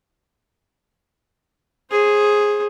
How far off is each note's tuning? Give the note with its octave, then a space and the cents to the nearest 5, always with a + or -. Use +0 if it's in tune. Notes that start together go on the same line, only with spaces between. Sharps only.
G#4 +0 C5 +30